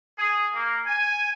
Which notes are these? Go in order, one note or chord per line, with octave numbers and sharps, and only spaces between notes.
G#4
A#3
G#5